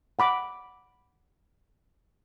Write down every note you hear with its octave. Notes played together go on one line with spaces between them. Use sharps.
F#5 B5 D6